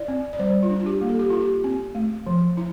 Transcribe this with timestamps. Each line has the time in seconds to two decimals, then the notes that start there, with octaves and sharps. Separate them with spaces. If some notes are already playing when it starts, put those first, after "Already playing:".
Already playing: E4 D5
0.08 C4
0.33 D5
0.39 G3 C5
0.63 F4
0.70 D4
0.80 F4
0.86 G4
1.01 A#3
1.09 A4
1.19 G4
1.30 E4 F4
1.41 G4
1.64 C4
1.95 A3
2.26 F3
2.57 E4